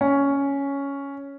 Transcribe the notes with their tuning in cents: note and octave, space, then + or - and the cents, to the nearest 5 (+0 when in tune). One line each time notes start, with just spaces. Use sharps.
C#4 +5